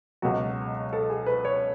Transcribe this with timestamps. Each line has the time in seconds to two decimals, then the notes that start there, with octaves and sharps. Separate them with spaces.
0.22 C#2 B2 F#3 F#4
0.93 A4
1.10 G#4
1.26 B4
1.45 C#5